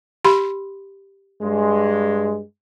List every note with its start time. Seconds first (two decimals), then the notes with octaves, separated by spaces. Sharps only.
0.25 G4 B5 C6
1.42 G2 G#3